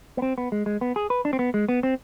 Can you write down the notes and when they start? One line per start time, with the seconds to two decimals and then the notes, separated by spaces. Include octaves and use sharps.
0.17 B3
0.22 C4
0.38 B3
0.52 G#3
0.66 G#3
0.81 B3
0.96 G#4
1.10 B4
1.25 D4
1.33 C4
1.39 B3
1.54 G#3
1.69 B3
1.83 C4